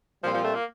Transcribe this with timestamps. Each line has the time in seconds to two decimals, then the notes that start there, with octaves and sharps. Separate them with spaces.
0.23 A#2 F3 G3 C4 F4
0.34 F3
0.44 A3
0.55 A#3